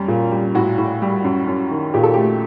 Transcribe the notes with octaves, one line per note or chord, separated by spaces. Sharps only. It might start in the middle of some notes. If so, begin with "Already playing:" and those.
Already playing: F#2 G3
A#2
G3
A2 F#4
A2
G3
F#2
F#2
D#3
A#2 G4
A4
A3 G4